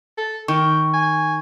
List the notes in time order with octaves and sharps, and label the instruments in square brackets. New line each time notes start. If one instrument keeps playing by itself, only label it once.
[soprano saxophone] A4
[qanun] D#3 [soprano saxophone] G5 [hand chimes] C#6
[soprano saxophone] G#5